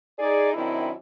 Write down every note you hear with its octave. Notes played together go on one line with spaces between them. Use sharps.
D#4 G#4 D5
F#2 D#3 C4 D4 E4